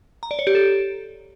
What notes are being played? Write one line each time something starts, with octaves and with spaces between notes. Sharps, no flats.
A#5
D5
C#5
G4
A4